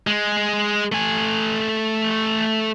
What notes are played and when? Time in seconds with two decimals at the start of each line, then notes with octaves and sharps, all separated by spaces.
0.07 G#3
0.92 A3 G#5